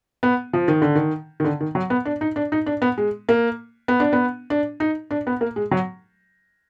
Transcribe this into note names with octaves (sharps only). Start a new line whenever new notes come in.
B3
F3
D#3
D3
D#3
D#3
D3
D#3
F#3
B3
D4
D#4
D4
D#4
D4
B3
G#3
A#3
B3
D4
B3
D4
D#4
D4
B3
A#3
G#3
F#3